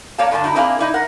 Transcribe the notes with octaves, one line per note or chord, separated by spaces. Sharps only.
A#3 C#5 D5 F5 A5
G2 D3 D4 G4 A5
F#3 D#4 E4
A#3 C4 D4 E4 G#4 F5
D#4 E4 D5
A#4 F#5